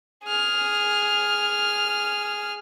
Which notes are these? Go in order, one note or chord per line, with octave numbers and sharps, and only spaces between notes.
G#4 F6